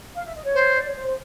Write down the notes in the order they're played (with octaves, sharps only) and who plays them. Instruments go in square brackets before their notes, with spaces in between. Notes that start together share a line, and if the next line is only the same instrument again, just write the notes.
[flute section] F5
E5
D#5
C#5
[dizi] C5
[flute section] D5
C#5
C5